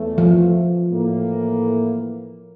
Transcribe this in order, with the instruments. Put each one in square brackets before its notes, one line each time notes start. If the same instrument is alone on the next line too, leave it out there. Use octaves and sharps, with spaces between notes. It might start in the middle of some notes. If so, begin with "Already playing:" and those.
Already playing: [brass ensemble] E2 E3 A3
[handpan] F3
[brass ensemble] A2 E3 A#3